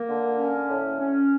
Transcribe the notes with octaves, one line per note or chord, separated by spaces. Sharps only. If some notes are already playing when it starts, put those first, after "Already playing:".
Already playing: A#3
D3
C#4
A2
C#4